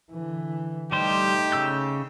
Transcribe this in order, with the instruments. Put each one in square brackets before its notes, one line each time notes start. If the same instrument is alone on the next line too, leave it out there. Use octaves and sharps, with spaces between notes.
[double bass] D3 E3
[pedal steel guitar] G3 C5 [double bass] A3 D#4 [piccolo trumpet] G4
[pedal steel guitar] C#3 E6 G6